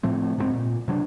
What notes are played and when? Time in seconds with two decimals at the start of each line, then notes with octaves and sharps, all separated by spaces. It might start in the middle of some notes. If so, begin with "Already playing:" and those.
0.03 A2 F3 A3 C4
0.37 C#2 G#2 F#3 C4
0.53 A#2
0.88 C3 F#3 C#4 D4